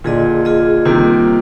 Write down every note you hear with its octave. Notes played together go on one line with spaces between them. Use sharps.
A#2 D3 F4 G#4 D#5
F4 G#4 D#5
C3 D#3 G3 A#3 F4